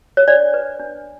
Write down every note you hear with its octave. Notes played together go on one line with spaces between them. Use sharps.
C#5
D4 D5
B4
D4